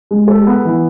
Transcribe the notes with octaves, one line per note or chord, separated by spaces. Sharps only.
G#3
A4
B3
E3